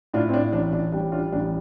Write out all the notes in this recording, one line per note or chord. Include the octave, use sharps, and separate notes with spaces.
A2 D4 F4
C4
D4
A1 D4
D4
G3 D4
D4 F4
A1 D4